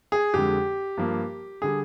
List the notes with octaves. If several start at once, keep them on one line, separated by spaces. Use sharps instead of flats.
G#4
F2 D3 G#3 G4
G2 F3 A#3
D3 G3 G#4